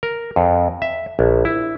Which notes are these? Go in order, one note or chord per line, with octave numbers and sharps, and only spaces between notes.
A#4
F2
E5
A#1
E4